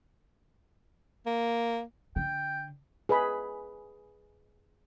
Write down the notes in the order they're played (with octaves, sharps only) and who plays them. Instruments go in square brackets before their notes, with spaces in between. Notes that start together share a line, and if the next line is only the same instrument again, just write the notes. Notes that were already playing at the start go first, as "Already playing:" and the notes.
[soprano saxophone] A#3
[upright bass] D3 [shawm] G5
[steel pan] G#4 B4 D#5 B5